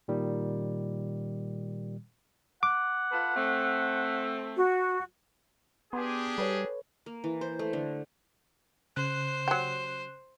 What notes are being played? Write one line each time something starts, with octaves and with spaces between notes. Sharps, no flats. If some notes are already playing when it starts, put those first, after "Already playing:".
A#2 D#3 G3
F#5 D6
F4 A4 B4
A3 C4
F#4
B3 D4 G4 G#4 C6
G3 A4 B4 C#5
A#3
E3
C5
A3
D3
C#3 C5 F#6
F#3 G4